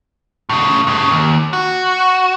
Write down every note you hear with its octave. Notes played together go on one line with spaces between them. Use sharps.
A2 C#3
G2 C#3
D#2
F#4